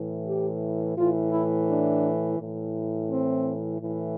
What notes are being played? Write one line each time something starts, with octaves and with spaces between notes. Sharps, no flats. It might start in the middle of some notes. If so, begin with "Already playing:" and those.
Already playing: A2 E3
G4
A2 E3 F4
E4
D4
A2 E3
C4
A2 E3